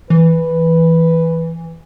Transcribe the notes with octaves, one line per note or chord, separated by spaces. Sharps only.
E3 B4